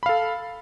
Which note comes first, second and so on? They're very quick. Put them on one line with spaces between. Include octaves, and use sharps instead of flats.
B5 F5 A4